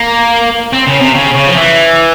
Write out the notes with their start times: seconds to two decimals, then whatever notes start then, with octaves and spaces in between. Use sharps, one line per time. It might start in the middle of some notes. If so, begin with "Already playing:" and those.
Already playing: A#3
0.73 C4
0.87 C#3
1.01 C3
1.15 C#3
1.35 C#3
1.48 F3
1.57 E3